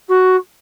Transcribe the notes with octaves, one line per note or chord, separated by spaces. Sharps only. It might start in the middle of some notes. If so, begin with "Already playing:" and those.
F#4